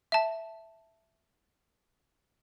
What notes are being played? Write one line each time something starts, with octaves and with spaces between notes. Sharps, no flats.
E5 A5